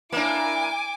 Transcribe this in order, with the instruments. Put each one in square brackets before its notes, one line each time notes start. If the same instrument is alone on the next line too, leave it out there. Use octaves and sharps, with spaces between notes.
[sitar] A#3 D4 [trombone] E4 [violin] G#5 D6